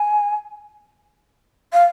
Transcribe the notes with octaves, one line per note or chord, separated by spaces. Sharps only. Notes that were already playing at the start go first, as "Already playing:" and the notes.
Already playing: G#5
F5